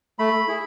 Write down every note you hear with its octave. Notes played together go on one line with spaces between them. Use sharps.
A3 B5
E4 G#4